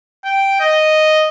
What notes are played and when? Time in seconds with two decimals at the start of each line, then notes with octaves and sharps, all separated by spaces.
0.25 G5
0.60 D#5